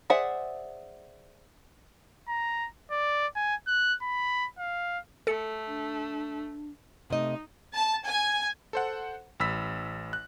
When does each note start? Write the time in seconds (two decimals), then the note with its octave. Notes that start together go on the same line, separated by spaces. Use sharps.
0.10 G#4 C5 D5 E5 F#5
2.28 A#5
2.91 D5
3.36 G#5
3.67 F#6
4.02 B5
4.59 F5
5.27 A3 A4 C#7
5.67 D4
7.10 C3 A3 D#4 D#5
7.73 A5
8.05 G#5
8.73 A4 C5 F#5
9.40 A1 B5 E6 B6
10.13 F#6